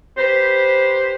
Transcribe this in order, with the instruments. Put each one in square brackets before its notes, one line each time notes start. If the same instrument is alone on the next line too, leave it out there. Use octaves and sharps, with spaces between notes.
[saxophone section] G4 B4 C5